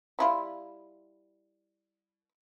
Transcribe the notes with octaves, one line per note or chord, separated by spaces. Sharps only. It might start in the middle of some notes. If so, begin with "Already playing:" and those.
G3 E4 F4